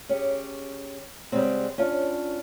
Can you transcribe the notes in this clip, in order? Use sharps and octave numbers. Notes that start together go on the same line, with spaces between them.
C#4 G4 G#4
C#3 G3 G#3 B3 C4
C#4 D4 F4